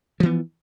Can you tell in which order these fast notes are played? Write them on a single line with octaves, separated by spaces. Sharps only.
F3 E3 B3